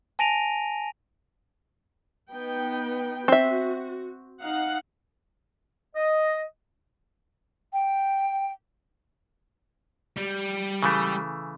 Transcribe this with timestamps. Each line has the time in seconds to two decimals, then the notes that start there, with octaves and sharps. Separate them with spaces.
0.19 G#5 A5 A#6 D7 D#7 F7
2.31 B3 D#4 G5
3.28 C4 F#4 E5
4.41 D#4 F5 F#5
5.96 D#5
7.72 G5
10.17 G3
10.83 C#3 E3 A3